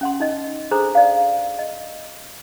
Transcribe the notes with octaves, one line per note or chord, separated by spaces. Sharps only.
C#4 F#5 C6
D#4 D#5
D4 G#4 A4 C5 A#5
D5 F5
D#5